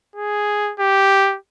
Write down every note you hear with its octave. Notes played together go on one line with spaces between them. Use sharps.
G#4
G4